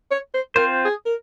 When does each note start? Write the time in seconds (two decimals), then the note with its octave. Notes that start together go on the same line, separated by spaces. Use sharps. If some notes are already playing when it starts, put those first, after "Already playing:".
0.11 C#5
0.34 C5
0.55 C4 F4 A#4 C5
0.85 G#4
1.06 A#4